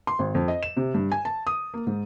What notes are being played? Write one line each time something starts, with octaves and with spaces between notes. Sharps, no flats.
C6
G#1
F2
D#5
E7
C3
G2
G#5
A5
D#6
A#3
G#2